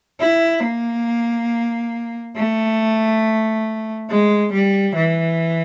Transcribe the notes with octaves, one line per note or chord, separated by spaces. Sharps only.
E4
A#3
A3
G#3
G3
E3